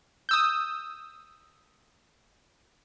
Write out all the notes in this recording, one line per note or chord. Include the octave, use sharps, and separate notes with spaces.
D#6 E6 G6